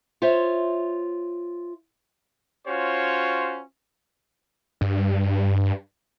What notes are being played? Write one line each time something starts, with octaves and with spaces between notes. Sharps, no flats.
F4 C5 C#5 E5
C#4 F4 F#4 C5 C#5
G2